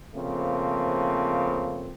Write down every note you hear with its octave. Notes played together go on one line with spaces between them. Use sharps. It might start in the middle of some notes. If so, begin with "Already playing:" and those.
C#3 F3 A3 A#3 C4